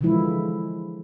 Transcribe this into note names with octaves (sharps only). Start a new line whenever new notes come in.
D3 E3 F3 G#3 E4